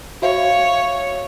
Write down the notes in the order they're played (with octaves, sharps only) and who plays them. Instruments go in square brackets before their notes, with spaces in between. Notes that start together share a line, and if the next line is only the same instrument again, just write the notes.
[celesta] F#4 E5 F5 [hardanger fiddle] C#5